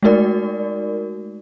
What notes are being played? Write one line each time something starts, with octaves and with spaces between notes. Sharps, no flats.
G#3 A3 D#4 F#4 A#4 D5